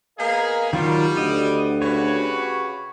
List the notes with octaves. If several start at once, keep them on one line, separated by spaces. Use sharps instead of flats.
A#3 B3 G#4 A#4 D#5 F5
A#2 D#3 F#3 G3 F4 F#4
D2 G4 D#5 F#5
C#3 F#4 B4 C#5